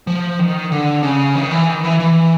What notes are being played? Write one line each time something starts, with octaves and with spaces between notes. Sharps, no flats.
F3
D#3
D3
C#3
D#3
E3
D#3
E3
E3